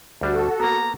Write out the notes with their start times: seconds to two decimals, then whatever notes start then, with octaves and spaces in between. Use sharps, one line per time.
0.21 D2 G3 D4 F#4 A4
0.60 A#3 B3 A#5